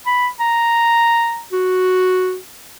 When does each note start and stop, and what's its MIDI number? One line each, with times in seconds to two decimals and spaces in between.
0.06 0.28 83
0.40 1.41 82
1.53 2.36 66